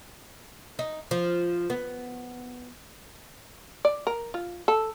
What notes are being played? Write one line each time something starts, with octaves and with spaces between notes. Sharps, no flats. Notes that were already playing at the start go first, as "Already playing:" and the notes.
D#4
F3
B3
D5
A#4
F4
A4